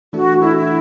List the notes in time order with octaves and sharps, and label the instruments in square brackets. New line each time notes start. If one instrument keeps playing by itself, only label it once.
[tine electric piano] E3 A3 D4 [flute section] F#4
[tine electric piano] E3 A3 D4 [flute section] E4
[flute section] E4